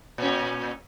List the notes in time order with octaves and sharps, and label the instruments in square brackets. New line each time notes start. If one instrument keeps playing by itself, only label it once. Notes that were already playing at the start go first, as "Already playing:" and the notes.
[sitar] A#2 C#4